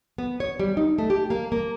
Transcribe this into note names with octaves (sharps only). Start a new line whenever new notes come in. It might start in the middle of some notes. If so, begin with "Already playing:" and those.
B3
C#5
G3
D#4
A3
G4
A#3
A#3